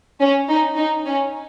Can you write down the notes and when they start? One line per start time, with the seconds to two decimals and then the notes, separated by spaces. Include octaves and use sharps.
0.21 C#4
0.49 D#4
0.77 D#4
1.06 C#4